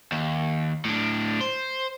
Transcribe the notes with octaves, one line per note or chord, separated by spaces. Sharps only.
D#2
A2 D4
C5